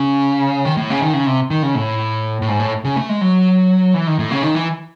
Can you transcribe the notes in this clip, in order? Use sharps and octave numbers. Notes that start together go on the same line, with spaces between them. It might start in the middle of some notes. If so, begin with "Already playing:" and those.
Already playing: C#3
D#3
A2
C#3
D#3
C#3
C3
D#3
C#3
A2
A2
G#2
A2
C#3
A3
G#3
F#3
E3
D#3
A2
C#3
D#3
E3